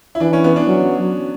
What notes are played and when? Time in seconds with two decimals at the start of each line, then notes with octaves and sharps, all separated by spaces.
0.15 E4
0.20 E3 D4
0.33 C#4
0.44 B3
0.56 D4
0.67 F#3